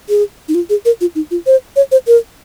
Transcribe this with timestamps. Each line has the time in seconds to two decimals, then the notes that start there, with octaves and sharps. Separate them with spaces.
0.09 G#4
0.48 D#4
0.54 F4
0.69 G#4
0.85 A#4
1.01 F4
1.15 D#4
1.31 F4
1.46 C5
1.76 C#5
1.91 C5
2.07 A#4